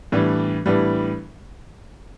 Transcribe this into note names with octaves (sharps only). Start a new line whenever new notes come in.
A2 E3 G3 B3 D4
A2 E3 G3 B3 D4